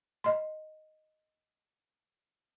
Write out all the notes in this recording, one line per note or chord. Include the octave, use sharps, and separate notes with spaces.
D#5 C6